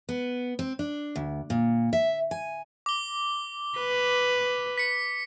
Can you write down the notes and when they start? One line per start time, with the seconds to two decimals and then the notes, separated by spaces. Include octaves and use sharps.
0.09 B3
0.59 C4
0.79 D4
1.16 D2
1.50 A#2
1.93 E5
2.31 G#5
2.86 D6 G7
3.79 B4
4.78 B6 C#7